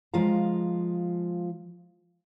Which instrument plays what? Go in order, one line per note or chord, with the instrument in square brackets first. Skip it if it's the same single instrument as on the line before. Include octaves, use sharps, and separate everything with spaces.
[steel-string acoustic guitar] F3 G#3 F4 F5 A#5